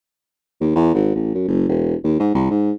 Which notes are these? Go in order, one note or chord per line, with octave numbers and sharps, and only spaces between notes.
D#2
E2
G#1
A1
F#2
F#1
E1
D#2
G#2
C2
G#2